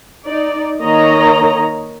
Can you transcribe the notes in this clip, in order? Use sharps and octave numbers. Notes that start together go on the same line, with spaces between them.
D#4 D5
D#3 A#3 C#5 D#5 A#5